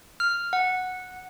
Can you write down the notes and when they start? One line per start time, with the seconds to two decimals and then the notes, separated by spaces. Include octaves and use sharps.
0.20 F6
0.53 F#5